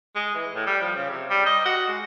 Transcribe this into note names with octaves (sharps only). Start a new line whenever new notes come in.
G#3
E3
A2
G3
F3
C#3
C3
G3
D#5
F#4
G#3